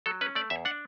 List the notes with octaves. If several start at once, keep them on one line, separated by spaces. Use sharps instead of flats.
F#3 A4
C#4 B4
A3 D5
E2 E5
D4 F#5